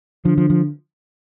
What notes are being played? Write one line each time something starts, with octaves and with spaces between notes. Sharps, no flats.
D3 F3
F3
F3